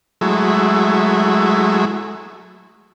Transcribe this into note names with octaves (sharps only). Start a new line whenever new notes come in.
F#3 G#3 A3 E4